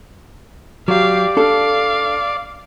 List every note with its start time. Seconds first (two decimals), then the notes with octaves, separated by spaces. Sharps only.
0.88 F#3 G4 D5 F5
1.37 D4 A4 F5